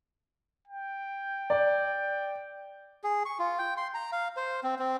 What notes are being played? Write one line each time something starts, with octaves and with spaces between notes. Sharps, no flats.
G5
D5
G#4
C#6
F4
G5
C6
A#5
F5
C5
C4
C4